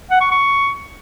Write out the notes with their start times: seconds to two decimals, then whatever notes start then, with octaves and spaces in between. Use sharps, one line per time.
0.11 F#5
0.21 C#6
0.31 C#6